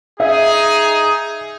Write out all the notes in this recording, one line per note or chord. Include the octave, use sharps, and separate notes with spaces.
D#4 G#4 E5